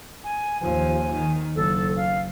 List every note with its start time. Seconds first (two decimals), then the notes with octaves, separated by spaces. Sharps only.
0.24 G#5
0.61 D#2 F3 G#5
1.12 D#3
1.56 F#1 A4
1.96 F5